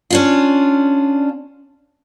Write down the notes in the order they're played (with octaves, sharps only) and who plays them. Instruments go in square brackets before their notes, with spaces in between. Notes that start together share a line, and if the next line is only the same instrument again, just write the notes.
[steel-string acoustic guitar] C#4 D4 F4